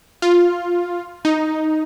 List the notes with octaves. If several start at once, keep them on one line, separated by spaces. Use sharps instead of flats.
F4
D#4